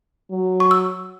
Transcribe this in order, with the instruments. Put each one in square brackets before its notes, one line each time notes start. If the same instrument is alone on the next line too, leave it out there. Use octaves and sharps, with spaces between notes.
[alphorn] F#3
[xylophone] C#6
E6